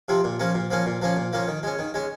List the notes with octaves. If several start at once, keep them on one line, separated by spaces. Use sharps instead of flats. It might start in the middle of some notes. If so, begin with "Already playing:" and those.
C3 F3 C4
A#2
F3 A#3 C#4
A#2
F3 A#3 C#4
A#2
F3 A#3 C#4
A#2
F3 A#3 C#4
D#3
G#3 C#4
D#3
G#3 C#4